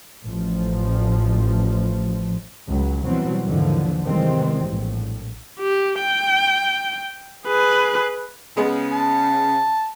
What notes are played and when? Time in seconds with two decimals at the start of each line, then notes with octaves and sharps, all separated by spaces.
0.24 A1 F3
2.69 C#2 F#3
3.04 B2 E3 F#3 G3 C4
3.46 D#2 G#2 D3 E3 F3
4.03 C3 D#3 E3 G3 G#3 C4
4.66 A#1 A2
5.60 G4
5.99 G5
7.46 G#4 B4
8.57 C#3 G#3 B3
8.93 A5